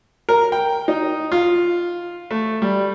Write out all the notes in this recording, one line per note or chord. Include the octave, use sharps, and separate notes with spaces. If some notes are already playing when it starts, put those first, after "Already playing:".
A#4
G5
D#4
F4
A3
G3